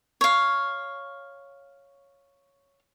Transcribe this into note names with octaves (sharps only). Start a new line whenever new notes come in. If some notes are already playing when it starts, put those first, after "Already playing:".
C#5 F5